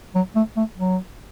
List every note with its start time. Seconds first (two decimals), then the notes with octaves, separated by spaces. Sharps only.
0.15 F#3
0.36 A3
0.57 A3
0.78 F#3